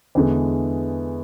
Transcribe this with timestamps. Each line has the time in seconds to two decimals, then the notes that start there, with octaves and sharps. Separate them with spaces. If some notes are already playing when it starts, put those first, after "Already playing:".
0.15 E2 D3 G#3